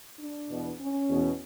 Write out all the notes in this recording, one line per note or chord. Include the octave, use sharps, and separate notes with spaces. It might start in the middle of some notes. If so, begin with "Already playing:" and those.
D4
E2 B2
C#4
E2 B2